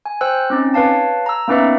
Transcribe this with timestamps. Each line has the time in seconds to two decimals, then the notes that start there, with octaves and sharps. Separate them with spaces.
0.06 G#5
0.21 C5 G5 E6 F#6
0.50 C4 C#4 D#4
0.74 B4 C#5 F5 A5
1.26 A#5 E6
1.48 A#3 B3 C#4 D#4 B4 E5